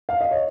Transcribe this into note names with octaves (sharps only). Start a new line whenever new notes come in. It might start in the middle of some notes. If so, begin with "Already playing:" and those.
F5
D#5
C#5